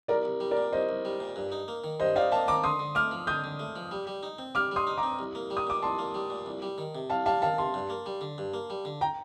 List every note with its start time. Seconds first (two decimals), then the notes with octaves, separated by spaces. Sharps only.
0.08 C2 A#4 D5
0.25 C2
0.40 G3
0.51 A#4 D5
0.57 A#2
0.72 C2 C5 D#5
0.89 C2
1.05 G3
1.20 A#2
1.36 G2
1.52 D#4
1.68 A#3
1.84 D#3
2.00 G2 C5 D#5
2.16 D#4 D5 F5
2.32 A#3 F5 A5
2.48 D#3 A#5 D6
2.64 D3 C6 D#6
2.79 D3
2.95 A3 D6 F6
3.11 F3
3.27 D3 D#6 G6
3.44 D3
3.59 A3
3.76 F3
3.91 G3
4.07 G3
4.23 D#4
4.38 C4
4.55 G3 D6 F6
4.71 G3 C6 D#6
4.87 D#4
4.98 A#5 D6
5.03 C4
5.19 C2
5.35 A#3
5.50 G3
5.57 D#6
5.67 A#2 D6
5.82 C2 A5 C6
5.99 A#3
6.14 G3
6.30 A#2
6.46 C2
6.62 G3
6.78 D#3
6.95 C3
7.09 C2 F5 A5
7.26 G3 F5 A5
7.42 D#3 F5 A5
7.58 C3 A5 C6
7.74 G2
7.90 A#3
8.06 G3
8.21 D3
8.38 G2
8.54 A#3
8.70 G3
8.85 D3
9.01 G5 A#5